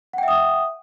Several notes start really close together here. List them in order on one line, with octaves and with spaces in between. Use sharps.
F#5 G5 E5 D#6